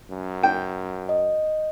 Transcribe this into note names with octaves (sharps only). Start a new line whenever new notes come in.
F#2
G5
D#5